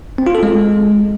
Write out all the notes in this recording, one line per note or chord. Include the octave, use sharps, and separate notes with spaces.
C4
F4
A4
G#3